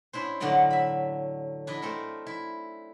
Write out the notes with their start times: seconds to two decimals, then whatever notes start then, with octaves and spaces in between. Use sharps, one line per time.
0.13 C#4 D4 E4 C5
0.40 A2 D3 F#3 A#3 D5 D#5
0.70 E5 B5
1.67 D4 E4 D#5
1.82 A3 C4 A4 A#4
2.27 E4